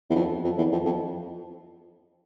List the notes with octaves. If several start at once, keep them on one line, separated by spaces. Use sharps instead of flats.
E2
F2
F2
E2
F2
F2